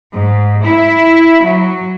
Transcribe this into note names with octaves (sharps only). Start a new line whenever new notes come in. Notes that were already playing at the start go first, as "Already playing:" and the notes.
G#2
E4
F#3